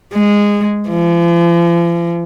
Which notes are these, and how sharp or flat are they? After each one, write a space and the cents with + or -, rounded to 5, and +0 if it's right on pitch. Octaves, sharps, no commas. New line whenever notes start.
G#3 -15
F3 -40